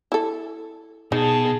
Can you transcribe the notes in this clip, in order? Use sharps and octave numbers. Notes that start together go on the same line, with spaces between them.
E4 A4
B2 D#4 G#4 A5